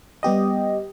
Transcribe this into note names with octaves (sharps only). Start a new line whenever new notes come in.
G3 B3 G4 D#5